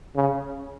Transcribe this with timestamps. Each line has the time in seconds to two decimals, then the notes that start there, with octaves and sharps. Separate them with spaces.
0.16 C#3